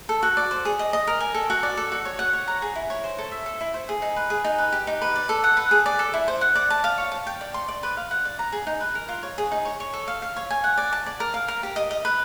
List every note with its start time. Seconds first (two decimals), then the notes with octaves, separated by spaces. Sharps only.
0.09 A4
0.23 F#4
0.37 D5
0.51 C5
0.65 G#4
0.79 D#5
0.93 D#5
1.07 A#4
1.20 G#5
1.34 A4
1.50 F#4
1.63 D5
1.77 A4
1.92 F#4
2.05 C#5
2.19 F#5
2.33 C#5
2.48 A#5
2.62 G#4
2.76 E4
2.90 C#5
3.04 C5
3.18 A4
3.32 E5
3.46 A4
3.61 E4
3.74 C5
3.89 G#4
4.02 D#4
4.16 B4
4.30 G#4
4.44 D#4
4.58 B4
4.73 G4
4.87 D#4
5.02 B4
5.16 D5
5.29 A4
5.44 F#5
5.57 B4
5.71 G#4
5.86 D5
5.99 A4
6.14 E4
6.28 C5
6.41 F#5
6.55 D5
6.70 A5
6.84 F5
6.98 C#5
7.12 A5
7.27 G5
7.41 D5
7.54 C6
7.68 D5
7.83 B4
7.97 F5
8.11 F#5
8.25 D5
8.39 A#5
8.52 G#4
8.67 D#4
8.81 B4
8.95 A#4
9.09 F4
9.23 C#5
9.38 G#4
9.52 D#4
9.65 C#5
9.80 C#5
9.94 A4
10.08 F5
10.22 F5
10.36 C#5
10.51 G#5
10.64 F#5
10.78 D5
10.93 A5
11.06 D5
11.20 A#4
11.34 F5
11.48 A#4
11.63 G4
11.76 D#5
11.91 D#5
12.05 B4